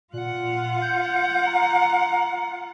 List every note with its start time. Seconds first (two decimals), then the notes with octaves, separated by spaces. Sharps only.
0.13 A#2 F4 F#5
0.82 G6
1.47 A#5